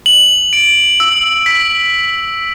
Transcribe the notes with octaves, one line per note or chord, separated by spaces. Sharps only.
F#7
D7
E6
B6